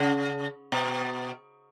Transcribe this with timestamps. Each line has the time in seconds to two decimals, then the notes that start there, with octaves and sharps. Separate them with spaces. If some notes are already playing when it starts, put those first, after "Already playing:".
Already playing: C#3
0.72 B2